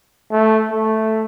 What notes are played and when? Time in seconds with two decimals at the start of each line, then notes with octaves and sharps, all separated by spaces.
0.31 A3
0.71 A3